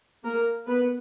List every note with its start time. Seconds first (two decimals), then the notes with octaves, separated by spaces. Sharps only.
0.23 A#3 A#4
0.66 B3 B4